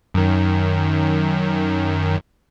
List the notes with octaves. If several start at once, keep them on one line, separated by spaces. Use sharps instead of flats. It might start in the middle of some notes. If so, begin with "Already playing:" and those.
F#2 D#3